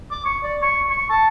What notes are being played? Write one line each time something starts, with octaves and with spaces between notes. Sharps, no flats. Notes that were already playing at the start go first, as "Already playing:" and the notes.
D6
C#6
D5
C#6
C#6
A5